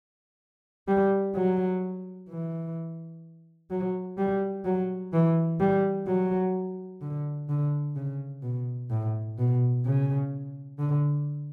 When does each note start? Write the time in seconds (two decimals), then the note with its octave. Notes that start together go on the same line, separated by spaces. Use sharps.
0.88 G3
1.35 F#3
2.29 E3
3.71 F#3
4.18 G3
4.65 F#3
5.13 E3
5.60 G3
6.07 F#3
7.02 D3
7.49 D3
7.96 C#3
8.43 B2
8.90 A2
9.38 B2
9.86 C#3
10.79 D3